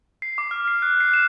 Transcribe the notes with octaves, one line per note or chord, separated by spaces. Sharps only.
C7
D6
F6
C7
F#6
C7
E7